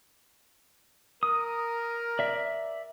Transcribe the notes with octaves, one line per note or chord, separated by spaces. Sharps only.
A#4 D#6
D5 E5